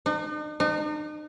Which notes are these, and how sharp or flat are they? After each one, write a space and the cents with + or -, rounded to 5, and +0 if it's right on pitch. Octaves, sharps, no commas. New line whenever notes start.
D#4 -45
D#4 -40